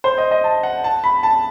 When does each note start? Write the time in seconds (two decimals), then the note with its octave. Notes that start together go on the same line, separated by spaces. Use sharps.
0.04 C5
0.18 D#5
0.31 D#5
0.44 A5
0.63 F#5
0.84 A5
1.04 B5
1.23 A5